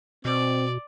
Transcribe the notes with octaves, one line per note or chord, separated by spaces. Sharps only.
B2 C4 D5